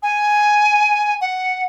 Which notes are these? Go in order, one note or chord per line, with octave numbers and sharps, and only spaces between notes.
G#5
F#5